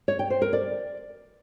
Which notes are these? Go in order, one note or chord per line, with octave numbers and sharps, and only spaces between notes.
C#5
G5
C5
A#4
D5